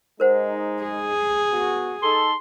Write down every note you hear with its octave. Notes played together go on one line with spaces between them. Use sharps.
G#3 D#4 A#4 C5 F#5
G#4
B3 F#4
D#4 A4 C6